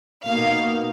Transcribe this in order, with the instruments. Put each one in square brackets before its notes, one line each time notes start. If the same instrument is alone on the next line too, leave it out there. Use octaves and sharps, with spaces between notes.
[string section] B2 A#3 D#4 F5